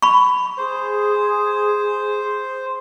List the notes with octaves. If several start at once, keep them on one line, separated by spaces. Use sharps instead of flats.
B5 C#6
G#4 C5